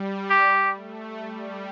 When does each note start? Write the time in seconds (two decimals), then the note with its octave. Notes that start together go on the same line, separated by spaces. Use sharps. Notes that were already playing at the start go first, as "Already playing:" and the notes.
Already playing: G3
0.30 G4
0.75 A3
1.20 G3